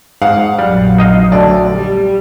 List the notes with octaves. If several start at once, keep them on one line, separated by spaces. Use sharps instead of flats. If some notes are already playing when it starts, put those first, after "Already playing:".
G#2 F5 F#5
A#1 F#2 G3
D#4 D#5 F5
D2 D3 D5
G3